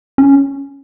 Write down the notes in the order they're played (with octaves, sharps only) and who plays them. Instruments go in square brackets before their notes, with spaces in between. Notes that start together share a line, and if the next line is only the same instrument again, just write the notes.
[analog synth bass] C#4